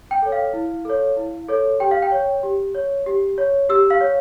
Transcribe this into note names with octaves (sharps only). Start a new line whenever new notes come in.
G5
A4 C#5
F5
E4
A4 C#5
E4
A4 C#5
G4 G5
F5
G5
C#5
G4
C#5
G4
C#5
G4 E6
F5
C#5